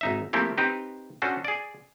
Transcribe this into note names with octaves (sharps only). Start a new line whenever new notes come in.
G#1 D#4 E5
F3 A3 A#3 C4 E4 G4
C4 D#4 G4 B4
C#4 D4 F#4 A4 C5
G#4 D5